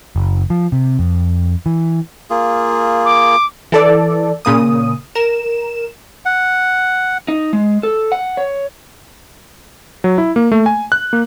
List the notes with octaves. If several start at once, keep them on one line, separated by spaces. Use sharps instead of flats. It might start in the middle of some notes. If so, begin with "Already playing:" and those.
F#1
F3
C3
F2
E3
A#3 F4 G#4
D6
E3 A4 D5
A#2 C#3 A#3 D#6
A#4 E7
F#5
D#4
G#3
A4
F#5
C#5
F#3
E4
A#3
A3
G#5
F#6
A#3